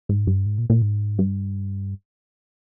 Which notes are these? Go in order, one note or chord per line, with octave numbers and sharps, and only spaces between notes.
G#2
G2
G#2
A#2
A#2
G#2
G2